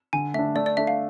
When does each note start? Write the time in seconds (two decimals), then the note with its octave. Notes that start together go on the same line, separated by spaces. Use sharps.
0.13 D3 G#5
0.34 A3 D4 E5
0.55 A3 D5
0.66 D5
0.77 D4 A4 E5
0.87 F5